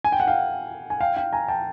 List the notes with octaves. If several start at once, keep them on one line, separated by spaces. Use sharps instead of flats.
G#5
G5
F#5
F5 G5
G#5
F5 G5
F5 G5
G#5 A#5
G5 A5